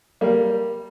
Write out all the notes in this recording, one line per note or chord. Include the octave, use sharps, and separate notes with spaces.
G3 A#3